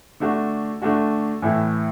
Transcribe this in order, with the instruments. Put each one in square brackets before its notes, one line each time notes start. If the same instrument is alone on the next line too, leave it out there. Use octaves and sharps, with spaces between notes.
[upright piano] D3 A3 D4 F#4
D3 A3 D4 F#4
A2 E3 A3 E4